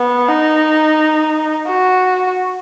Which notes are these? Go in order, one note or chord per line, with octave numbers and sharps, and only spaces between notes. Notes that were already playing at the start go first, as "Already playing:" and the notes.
Already playing: B3
D#4
F#4